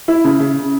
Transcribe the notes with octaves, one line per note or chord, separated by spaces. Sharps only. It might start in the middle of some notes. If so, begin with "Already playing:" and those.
E4
C#3
C#3